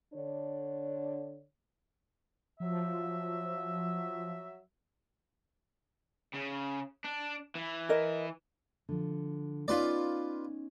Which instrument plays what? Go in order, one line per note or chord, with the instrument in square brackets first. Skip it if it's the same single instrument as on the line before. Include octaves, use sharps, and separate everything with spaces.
[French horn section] D3 D4 C#5
[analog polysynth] F3 [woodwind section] F#3 E5
[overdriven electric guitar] C#3
D4
E3
[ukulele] A#4 D#5
[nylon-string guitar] D3 F3
[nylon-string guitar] B3 C#4 D#4 [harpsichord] F4 B4 D5